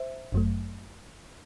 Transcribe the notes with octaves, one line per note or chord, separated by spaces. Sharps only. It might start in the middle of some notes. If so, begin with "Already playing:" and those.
Already playing: C5 E5
G1 F#2 F#3 A3